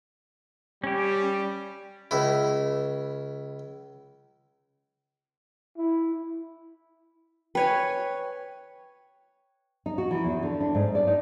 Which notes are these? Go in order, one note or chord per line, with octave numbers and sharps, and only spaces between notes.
G3 C#4 G4
C#2 E4
E4
B4 C#5 G5 G#5
D#4
F#4
E3
E2
D3
D4
G#2
D5
D#4